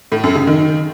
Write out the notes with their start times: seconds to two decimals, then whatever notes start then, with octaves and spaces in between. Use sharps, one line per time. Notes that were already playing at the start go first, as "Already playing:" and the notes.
0.12 A2
0.24 F#2
0.35 C#3
0.47 D#3